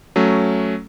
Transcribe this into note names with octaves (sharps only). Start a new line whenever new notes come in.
F#3 A3 C#4